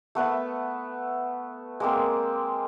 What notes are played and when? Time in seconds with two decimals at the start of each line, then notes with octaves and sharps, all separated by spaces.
0.15 A3 B3 B4 E5
1.80 G#3 A#3 C4